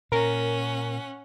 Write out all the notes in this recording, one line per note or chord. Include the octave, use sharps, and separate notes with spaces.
A#2 C#4 A#4 F#5